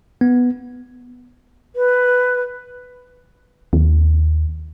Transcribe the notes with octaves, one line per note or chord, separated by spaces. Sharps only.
B3
B4
D#2